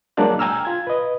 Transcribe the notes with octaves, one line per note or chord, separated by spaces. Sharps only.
F#3 G#3 A#3 D4 D5 F#6
G5 G#5 A#5 E6 F6
F4 G#6
B4 D#5